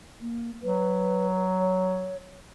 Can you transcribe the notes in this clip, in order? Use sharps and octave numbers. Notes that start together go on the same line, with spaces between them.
A#3
F#3 B4
C#5